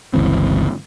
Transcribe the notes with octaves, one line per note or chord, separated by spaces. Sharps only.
G1 C#2 E3 C4